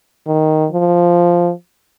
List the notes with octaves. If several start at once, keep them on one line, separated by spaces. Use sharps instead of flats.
D#3
F3